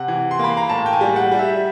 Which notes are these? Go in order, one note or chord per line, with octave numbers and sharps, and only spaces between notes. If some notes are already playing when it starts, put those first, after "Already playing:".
Already playing: C3 F#5
E3
C6
A#3 B5
A#5
A2 A5
G5
G#5
G3
F#5
G3
E5